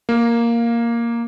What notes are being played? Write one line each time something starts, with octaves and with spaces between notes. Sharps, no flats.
A#3